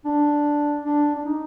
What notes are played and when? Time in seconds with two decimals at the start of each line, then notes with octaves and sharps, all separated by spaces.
0.05 D4
0.85 D4
1.16 D4
1.25 D#4